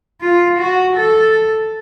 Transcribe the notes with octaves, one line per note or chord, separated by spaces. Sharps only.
F4
F#4
A4